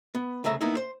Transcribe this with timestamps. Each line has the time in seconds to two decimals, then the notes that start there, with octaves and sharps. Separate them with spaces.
0.15 B3
0.44 C2 C#3 A3 E5 A#5
0.61 A#3 B3 D#4 E4
0.77 C5